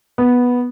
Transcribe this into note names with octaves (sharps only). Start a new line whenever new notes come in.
B3